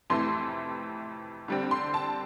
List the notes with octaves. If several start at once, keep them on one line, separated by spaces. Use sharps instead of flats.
F2 C3 E3 A3 C6
D3 G3 C4
C6
A5